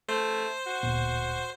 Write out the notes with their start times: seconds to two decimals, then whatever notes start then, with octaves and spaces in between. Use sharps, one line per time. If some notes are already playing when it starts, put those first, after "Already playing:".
0.08 A3 C5
0.66 F#4
0.83 D1 A#2 B3